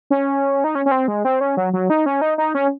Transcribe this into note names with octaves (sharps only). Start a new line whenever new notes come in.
C#4
D#4
C#4
C#4
C4
G#3
C4
C#4
F#3
F#3
D#4
C#4
D#4
D#4
C#4